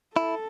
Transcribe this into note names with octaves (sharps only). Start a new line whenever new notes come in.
E4 A4